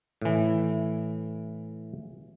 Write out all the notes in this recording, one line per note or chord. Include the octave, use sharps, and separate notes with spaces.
A2 E3